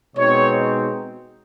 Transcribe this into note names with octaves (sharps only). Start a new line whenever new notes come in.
B2 G#3 C4 D#4 C#5